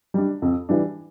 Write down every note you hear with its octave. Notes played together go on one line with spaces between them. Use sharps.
G3 D4
F2
E3 G3 D4